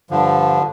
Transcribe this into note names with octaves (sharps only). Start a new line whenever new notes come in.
G2 D3 F3